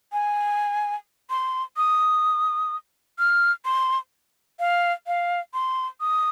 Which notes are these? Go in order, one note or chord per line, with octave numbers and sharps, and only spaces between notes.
G#5
C6
D#6
F6
C6
F5
F5
C6
D#6